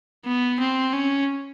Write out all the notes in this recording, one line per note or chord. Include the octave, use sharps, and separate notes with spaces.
B3
C4
C#4